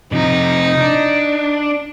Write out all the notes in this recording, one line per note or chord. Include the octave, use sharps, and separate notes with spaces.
C3 F3 D#4
D4